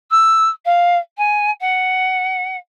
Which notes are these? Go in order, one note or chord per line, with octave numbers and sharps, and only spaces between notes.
E6
F5
G#5
F#5